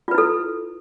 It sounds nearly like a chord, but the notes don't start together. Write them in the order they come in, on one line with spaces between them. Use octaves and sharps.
F4 B4 E4 A4